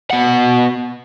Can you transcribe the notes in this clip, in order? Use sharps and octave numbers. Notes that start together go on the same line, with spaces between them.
B2 F#5